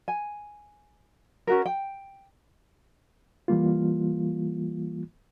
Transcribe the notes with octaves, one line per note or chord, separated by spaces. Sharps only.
G#5
C#4 F#4 A#4
G5
E3 G3 A#3 F4